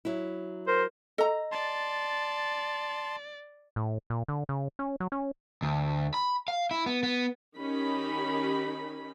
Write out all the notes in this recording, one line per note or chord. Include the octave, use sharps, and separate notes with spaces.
F#3 E4
A#4 C5
A4 D#5 A#5
D5 A5 C6
A2
A#2
D3
C#3
C#4
F#3
C#4
D2
B5
F5
E4
B3
B3
D#3 C#4 D#4 G4 B5